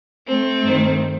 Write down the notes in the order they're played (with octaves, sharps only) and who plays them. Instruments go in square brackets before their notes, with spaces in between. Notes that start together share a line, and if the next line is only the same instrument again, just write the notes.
[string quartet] A3 C4
G2 D#3